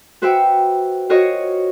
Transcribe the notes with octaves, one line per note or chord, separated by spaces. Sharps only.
F#4 B4 C5 E5 F#5 G5
F4 F#4 A#4 C5 C#5 D#5